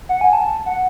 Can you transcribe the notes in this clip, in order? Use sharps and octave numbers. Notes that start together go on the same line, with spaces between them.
F#5
G#5
A5
F#5